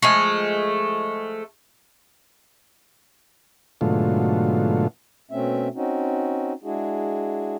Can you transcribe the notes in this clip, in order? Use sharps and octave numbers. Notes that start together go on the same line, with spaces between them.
F3 G#3 A3
G#2 B2 D3 F#3 A3 F4
B2 A3 C4 C#4 E5
C4 C#4 D#4 F#4
G#3 D4 E4 F#4 G#4